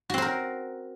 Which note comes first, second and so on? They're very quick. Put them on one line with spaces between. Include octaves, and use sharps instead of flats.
F#4 C4 C5 A#4